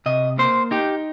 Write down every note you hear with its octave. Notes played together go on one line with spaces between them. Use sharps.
C3 D#5
A#3 C5
D#4 G4